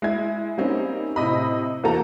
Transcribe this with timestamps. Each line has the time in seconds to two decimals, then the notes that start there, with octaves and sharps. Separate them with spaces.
0.02 G#3 E4 G#6
0.58 G3 A#3 C4 C#4 D#4
1.16 A2 C3 D#5 B5
1.84 E2 A#3 F#4 A4 A#5